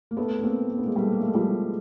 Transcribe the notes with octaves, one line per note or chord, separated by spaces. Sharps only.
A#3
A3 B3
B3
A#3 C4
A#3
B3
G#3 A#3
G3 A3
A#3
A3
G#3
F3 G3